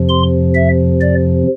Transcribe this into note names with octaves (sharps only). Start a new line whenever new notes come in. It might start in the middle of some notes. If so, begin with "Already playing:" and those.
Already playing: F2 C3 F3
C6
E5
D5